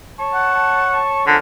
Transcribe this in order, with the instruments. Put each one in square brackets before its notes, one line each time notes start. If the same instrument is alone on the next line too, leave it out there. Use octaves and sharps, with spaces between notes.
[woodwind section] C#5 A5 C#6
[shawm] F#5
[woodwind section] F2 C#4 A#4 [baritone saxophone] D3